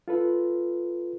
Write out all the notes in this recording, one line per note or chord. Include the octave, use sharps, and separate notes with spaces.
F4 A4 B4